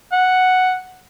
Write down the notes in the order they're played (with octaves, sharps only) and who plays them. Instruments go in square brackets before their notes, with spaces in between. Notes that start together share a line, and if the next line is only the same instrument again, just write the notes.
[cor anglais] F#5